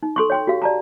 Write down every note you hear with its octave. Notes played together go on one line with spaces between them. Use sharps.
D#4
A4 C6 C#6
C#5 G5 C6
F#4 G4 F5
D5 A5 A#5